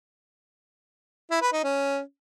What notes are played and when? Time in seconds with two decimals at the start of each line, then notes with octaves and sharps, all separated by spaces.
1.31 E4
1.42 B4
1.53 D#4
1.64 C#4